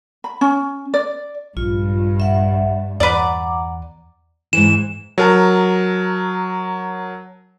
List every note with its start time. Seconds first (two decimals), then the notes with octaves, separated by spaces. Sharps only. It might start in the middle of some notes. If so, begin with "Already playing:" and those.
0.24 B5
0.41 C#4
0.94 D5
1.57 A#1 G2 F4
2.20 E5 F#5
3.00 E2 B4 D5 F#5 A#5 D6
4.53 G#2 E3 E7
5.18 F#3 A#4 A5